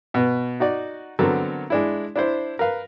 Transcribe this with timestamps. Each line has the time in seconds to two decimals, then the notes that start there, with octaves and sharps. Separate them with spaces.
0.14 B2 B3
0.60 D#4 F#4 D5
1.19 D3 F#3 B3 C4 A4 A#4
1.70 G#3 D4 E4
2.16 D4 E4 C5
2.59 A#4 B4 F5